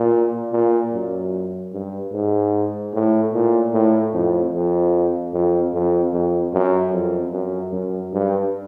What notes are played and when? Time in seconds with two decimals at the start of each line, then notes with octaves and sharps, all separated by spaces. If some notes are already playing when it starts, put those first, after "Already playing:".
Already playing: A#2
0.52 A#2
0.93 F#2
1.73 G2
2.13 G#2
2.93 A2
3.33 A#2
3.73 A2
4.13 F2
4.53 F2
5.33 F2
5.73 F2
6.13 F2
6.53 F#2
6.93 F2
7.32 F#2
7.72 F#2
8.13 G2